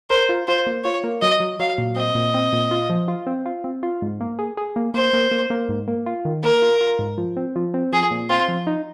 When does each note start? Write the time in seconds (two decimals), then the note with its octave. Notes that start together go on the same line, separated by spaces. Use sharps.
0.10 A#4 C5
0.29 F4
0.48 F4 C5
0.67 A#3
0.84 F4 C#5
1.04 A#3
1.22 F#3 D#5
1.40 F#3
1.59 F#3 F5
1.78 A#2
1.96 C4 D#5
2.15 A#2
2.34 C4
2.53 A#2
2.71 F4
2.90 F3
3.08 F4
3.27 C4
3.46 F4
3.64 C4
3.83 F4
4.02 G#2
4.21 A#3
4.39 G#4
4.57 G#4
4.76 A#3
4.94 A#3 C5
5.13 A#3
5.31 A#3
5.50 A#3
5.69 G#2
5.88 A#3
6.06 F4
6.25 D#3
6.43 A#3 A#4
6.62 F4
6.81 F4
6.99 G#2
7.18 F3
7.37 C4
7.56 F3
7.74 C4
7.93 F3 G#4
8.11 A#2
8.30 C4 F4
8.48 F3
8.67 D#4